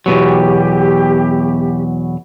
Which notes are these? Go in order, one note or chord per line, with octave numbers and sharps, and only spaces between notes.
E2 B2 F#3 G4